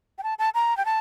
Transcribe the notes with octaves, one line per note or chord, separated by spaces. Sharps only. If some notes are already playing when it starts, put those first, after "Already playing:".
G5
A5
A5
A#5
G5
A5